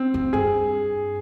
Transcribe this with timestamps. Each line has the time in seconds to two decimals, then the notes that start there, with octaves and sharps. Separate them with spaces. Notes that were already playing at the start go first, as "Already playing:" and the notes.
Already playing: C4
0.14 F2
0.33 G2 G#4